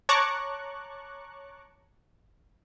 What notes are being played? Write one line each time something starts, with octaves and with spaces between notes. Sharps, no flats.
C#5 A5 A#5 C#6 D6 F#6